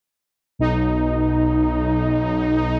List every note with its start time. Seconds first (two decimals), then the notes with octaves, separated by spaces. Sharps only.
0.59 B1 D#4